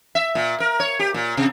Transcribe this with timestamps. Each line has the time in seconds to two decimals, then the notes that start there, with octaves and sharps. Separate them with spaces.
0.15 E5
0.35 A#2
0.60 A#4
0.80 C#5
0.99 G4
1.14 A#2
1.37 C3